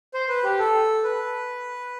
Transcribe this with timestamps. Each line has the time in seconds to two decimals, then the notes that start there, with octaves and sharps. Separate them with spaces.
0.14 C5
0.29 B4
0.44 G4
0.59 A4
1.04 B4